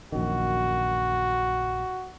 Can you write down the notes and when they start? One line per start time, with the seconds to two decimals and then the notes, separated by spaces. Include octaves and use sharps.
0.12 A#1 F#2 D#3 F#4